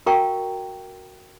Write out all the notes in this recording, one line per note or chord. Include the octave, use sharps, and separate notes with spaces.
F#4 A#4 F5 G5 A#5 C#6